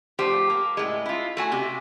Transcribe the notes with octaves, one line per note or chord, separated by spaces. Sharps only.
F3 A3 G4 C5
A#3
A2 G#3
E4 F4
A3 F#4 G#5
C3 G4